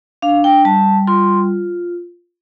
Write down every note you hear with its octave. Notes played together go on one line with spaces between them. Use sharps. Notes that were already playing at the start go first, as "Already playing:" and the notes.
D4 F5
G5
G3 A5
F4 C6